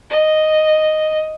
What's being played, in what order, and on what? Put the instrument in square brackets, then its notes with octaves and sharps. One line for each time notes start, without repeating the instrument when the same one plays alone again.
[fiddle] D#5